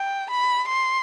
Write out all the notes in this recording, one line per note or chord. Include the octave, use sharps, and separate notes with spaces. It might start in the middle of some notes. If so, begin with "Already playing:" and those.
Already playing: G5
B5
C6